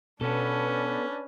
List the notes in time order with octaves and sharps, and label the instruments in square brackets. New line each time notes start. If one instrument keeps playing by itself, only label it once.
[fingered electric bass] B2 [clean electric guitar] B3 A4 [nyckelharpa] C#4 [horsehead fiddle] D4 B4